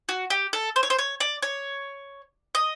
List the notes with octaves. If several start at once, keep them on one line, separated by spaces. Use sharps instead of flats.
F#4
G4
A4
C5
C#5
C5
C#5
D5
C#5
D#5